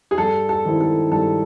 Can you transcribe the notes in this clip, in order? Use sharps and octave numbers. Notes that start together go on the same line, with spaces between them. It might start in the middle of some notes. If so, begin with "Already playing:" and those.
G#4
G2 A4
A4
D#3 G#3 C4 E4
A4
G2 A4